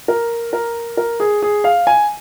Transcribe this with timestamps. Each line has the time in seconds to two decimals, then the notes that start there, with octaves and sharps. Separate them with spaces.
0.08 A#4
0.53 A#4
0.97 A#4
1.20 G#4
1.42 G#4
1.64 F5
1.87 G#5